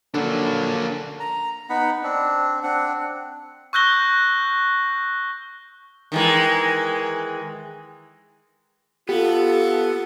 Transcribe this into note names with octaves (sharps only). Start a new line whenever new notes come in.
D3 F#3 A#3 D4 A4
A#5
B3 D#4 F#5 B5
C4 D4
C4 D4 F#5
C#6 E6 F#6 G6 A#6 G7
D#3 E3 G#3
B3 F4 G4 A4